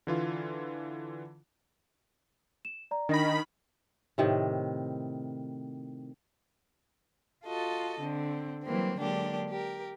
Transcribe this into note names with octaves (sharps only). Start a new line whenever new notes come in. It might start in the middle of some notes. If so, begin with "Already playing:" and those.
D3 E3 F4
E7
D5 A#5
D#3 D4 D#5 B5 A#6
A2 C3 D#3
F4 F#4 A4 D#5
D3 C4
E3 F#3 G3 A#3 C4
D3 F#3 G#3 A#3 D4 G4
G4 A#4